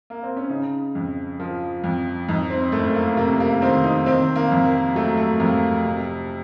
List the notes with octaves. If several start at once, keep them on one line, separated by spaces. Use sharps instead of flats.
A#3
C4
C#4
C#3 D#4
F2
F3
F2
F2 D#4
C4
F#1 A3
A#3
C3 A#3
A#3
D#3 C4
D#4
D#3 C4
A#3
F2
A#3
F#3 A3
A3
F2 A#3
C3